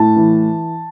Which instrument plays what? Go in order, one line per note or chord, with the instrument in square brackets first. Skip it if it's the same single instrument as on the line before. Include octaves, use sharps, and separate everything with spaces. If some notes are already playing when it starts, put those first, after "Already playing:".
Already playing: [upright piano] A2 A5
E3